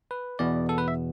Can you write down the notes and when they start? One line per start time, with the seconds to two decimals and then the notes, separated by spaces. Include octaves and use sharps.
0.11 B4
0.39 E2 B2 B3 D5
0.69 A4
0.78 B4
0.88 E5